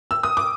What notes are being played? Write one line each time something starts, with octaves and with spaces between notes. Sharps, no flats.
E6
D#6
D6